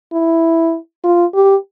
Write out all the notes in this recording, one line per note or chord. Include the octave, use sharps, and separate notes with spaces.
E4
F4
G4